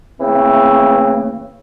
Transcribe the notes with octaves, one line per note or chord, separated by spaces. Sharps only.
C#3 E3 A3 A#3 C4